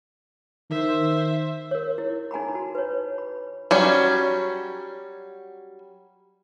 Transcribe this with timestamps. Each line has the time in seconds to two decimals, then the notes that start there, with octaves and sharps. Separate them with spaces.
0.71 D#3 C5 E5
1.71 A#4 C#5
1.98 E4
2.31 D#4 G#5 A#5 B5
2.55 F#4 A5
2.75 B4 C#5
3.18 B5
3.71 F#3 G3 C#4